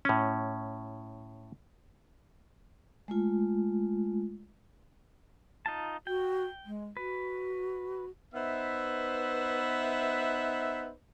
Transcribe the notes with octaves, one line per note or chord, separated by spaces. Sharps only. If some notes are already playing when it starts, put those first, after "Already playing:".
A2 C#4
G#3 A3 F4
D#4 F4 A5
F#4 G5
G#3
F#4 B4
B3 D#4 B4 C5 E5